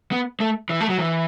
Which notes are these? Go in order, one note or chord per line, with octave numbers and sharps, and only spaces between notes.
B3
A3
E3
A3
F#3
E3